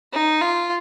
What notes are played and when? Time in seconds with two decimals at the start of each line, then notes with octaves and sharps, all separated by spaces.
0.13 D#4
0.41 F4